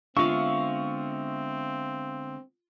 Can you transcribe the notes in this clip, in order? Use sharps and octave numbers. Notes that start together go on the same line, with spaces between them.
D3 G#3 B3 C4 F4 E5 F5 C#6